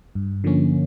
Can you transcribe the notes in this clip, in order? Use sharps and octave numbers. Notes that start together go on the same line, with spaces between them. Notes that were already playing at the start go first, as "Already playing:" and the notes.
G2
D3 F3 A#3 C#4